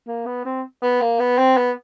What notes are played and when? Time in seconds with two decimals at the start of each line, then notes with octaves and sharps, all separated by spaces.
0.08 A#3
0.26 B3
0.45 C4
0.82 B3
1.01 A#3
1.20 B3
1.38 C4
1.57 B3